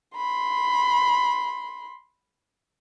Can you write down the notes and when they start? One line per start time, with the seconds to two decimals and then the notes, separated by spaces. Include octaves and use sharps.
0.16 B5 C6